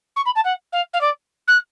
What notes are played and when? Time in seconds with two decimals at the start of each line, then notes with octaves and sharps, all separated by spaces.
0.16 C#6
0.25 B5
0.35 A5
0.44 F#5
0.72 F5
0.93 F5
1.01 D5
1.47 F#6